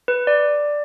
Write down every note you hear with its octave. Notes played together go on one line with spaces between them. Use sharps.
B4
D5